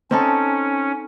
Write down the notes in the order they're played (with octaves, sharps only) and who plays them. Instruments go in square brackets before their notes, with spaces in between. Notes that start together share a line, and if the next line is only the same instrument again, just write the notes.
[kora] C4 D#4 A4 [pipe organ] C#4